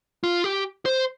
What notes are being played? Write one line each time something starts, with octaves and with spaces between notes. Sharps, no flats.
F4
G4
C5